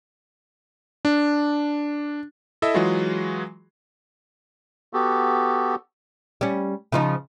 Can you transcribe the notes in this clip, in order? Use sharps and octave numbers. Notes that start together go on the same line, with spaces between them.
D4
E4 A4 D#5 E5
E3 F#3 G#3 F4 F#4 G#4
B3 F#4 G4 A4
G3 C#4
C#3 F3 D#4